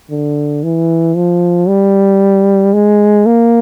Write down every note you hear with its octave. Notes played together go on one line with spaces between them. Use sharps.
D3
E3
F3
G3
G#3
A#3